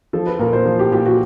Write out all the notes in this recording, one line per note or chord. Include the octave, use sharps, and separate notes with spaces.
F3 A4
B4
A#2 A#4
C5
F3
G4
A#2 G4
F#4